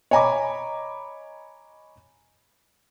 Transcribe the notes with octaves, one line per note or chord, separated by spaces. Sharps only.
C#5 D#5 G#5 A#5 B5 D6